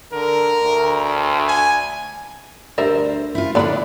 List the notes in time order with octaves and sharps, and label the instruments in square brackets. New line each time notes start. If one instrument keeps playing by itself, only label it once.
[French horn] D3 [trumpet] A#4
[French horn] D2
[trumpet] G#5
[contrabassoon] D2 [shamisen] G3 A#4 E5 [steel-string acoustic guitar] C5
[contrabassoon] C#2 [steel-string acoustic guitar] E4 F4
[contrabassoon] A2 [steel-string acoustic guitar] D3 D4 [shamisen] B3 D5 B5